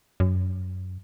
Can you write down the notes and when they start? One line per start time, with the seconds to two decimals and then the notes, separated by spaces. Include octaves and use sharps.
0.20 F#2